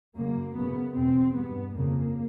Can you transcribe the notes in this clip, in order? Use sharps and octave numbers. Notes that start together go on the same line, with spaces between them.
F#2 C#3 A#3
F#2 C#3 B3
E2 B2 C4
G2 B3
F2 C#3 A#3